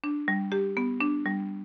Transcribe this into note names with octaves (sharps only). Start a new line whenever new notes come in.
D4
G3
G4
B3
D4
G3